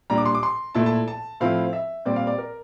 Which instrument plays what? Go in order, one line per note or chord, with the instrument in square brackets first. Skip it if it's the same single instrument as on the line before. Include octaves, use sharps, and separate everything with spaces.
[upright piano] A#2 G3 D4 A#5
D6
C6
D6
C6
A#2 A3 E4 A5
A5
A5
A2 F3 C4 E4 F5
E5
A#2 G3 C4 D5
F5
D5
A#4